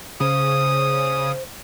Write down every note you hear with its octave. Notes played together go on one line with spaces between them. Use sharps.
C#3 C5 D#6